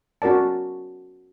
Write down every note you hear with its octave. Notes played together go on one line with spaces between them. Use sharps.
C#4 F#4 A#4 D5 A5